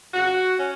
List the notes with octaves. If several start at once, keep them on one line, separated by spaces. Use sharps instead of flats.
F2 C#3 F#3 F#4
C#4